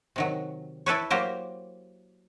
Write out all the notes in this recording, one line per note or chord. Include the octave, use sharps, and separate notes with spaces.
C3 D#3 F#3
E4 A4 B4 C#5
F#3 A#3 G4 A#4 C5